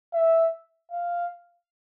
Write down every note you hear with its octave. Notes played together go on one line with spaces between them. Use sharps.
E5
F5